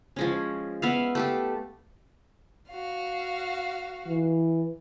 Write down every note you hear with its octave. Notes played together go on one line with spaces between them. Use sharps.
F3 G#3 C#4
B3 E5 F5
A3 G4 A4
F#4 F5
E3